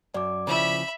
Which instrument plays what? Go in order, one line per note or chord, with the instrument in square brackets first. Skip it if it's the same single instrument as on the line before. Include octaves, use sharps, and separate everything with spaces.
[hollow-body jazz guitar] F#2 [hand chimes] D5 D6
[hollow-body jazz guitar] C#3 F3 E4 [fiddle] E5 B5